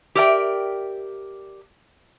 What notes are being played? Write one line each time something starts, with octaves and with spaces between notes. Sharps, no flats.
G4 A#4 D5 E5 G5